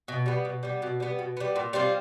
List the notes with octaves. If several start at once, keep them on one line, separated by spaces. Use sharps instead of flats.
B2
G3 B3
B2
G3 B3
B2
G3 B3
B2
G3 B3
A#2
G3 C4 F4